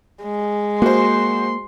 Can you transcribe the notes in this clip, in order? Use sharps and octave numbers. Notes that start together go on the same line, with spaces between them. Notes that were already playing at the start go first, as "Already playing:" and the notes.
G#3
A#3 F#4 C5 C6